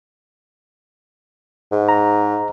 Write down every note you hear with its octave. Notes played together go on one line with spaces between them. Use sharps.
G#2
A#5